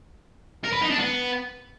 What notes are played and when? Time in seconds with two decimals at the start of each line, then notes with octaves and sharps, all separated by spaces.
0.64 A#4
0.73 B4
0.81 D#4
0.90 D4
0.99 B3